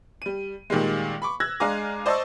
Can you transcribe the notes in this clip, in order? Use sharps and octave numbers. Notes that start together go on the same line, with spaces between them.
G3 D#7
A#2 D#3 G3 G#3
B5 C#6 D6
E6 F#6 G#6 A#6
G#3 D4 F5 G#5 A#5 D6
C5 D5 D#5 A5 C#6 E6